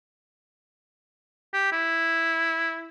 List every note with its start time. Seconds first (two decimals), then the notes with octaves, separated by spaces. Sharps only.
1.53 G4
1.72 E4